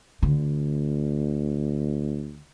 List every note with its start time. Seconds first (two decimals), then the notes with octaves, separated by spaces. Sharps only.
0.23 D2 D3